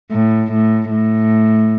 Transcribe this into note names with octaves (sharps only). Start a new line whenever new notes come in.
A2
A2
A2